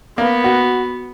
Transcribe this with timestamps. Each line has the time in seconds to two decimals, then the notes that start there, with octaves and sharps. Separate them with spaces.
0.18 A#3 B3
0.44 F#4